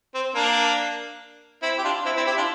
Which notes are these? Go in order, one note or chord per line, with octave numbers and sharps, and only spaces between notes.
C4
A#3 D4
C4 E4
G4
D4 F4
C4 E4
C4 E4
E4 G4
D4 F4